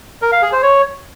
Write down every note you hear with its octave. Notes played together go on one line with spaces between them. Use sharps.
A#4
F5
G#4
C5
C#5